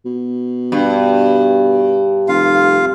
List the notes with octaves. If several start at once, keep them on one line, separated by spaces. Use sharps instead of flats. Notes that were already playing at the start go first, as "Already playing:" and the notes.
B2
G2
F1 F4 F5